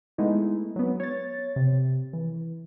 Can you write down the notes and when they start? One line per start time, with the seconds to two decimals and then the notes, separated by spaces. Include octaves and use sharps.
0.18 G#3 A3 B3 D#4 E4
0.76 F#3 B3
1.00 C#5 A6
1.56 C3
2.13 E3